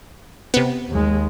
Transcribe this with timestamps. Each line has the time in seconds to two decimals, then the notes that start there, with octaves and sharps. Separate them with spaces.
0.54 C3 B3
0.91 D#2 G#3